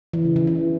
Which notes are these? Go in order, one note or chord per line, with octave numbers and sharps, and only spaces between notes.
E3
C#3
E3
E3